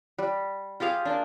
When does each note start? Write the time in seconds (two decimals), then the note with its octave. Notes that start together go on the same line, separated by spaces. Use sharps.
0.18 G3
0.80 F4 G4 G#4 F5
1.05 A#3 D4